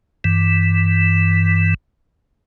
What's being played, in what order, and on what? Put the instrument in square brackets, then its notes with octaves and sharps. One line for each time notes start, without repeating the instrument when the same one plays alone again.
[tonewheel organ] G2 E3